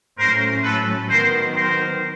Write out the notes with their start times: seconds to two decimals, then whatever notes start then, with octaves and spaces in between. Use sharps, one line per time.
0.18 A2 F#3 A3 C#4 A#4 C5
0.64 A4 B4
1.09 D#3 F#3 B3 A#4 C5
1.54 A#4 C5